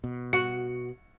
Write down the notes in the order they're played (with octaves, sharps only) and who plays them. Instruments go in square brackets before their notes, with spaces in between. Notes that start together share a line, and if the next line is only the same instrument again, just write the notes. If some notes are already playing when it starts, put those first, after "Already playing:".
[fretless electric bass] B2
[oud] F#4 [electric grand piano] C#7